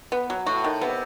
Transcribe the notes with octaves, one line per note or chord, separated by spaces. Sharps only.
B3
F#3
A2 F#4
D#3
C3 B3